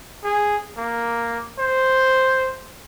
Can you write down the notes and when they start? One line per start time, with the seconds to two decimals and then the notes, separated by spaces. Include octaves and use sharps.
0.24 G#4
0.77 A#3
1.59 C5